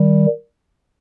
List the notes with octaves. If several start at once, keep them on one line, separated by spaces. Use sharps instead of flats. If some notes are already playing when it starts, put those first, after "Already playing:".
Already playing: D#3 G3